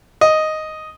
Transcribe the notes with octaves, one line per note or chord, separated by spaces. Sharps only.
D#5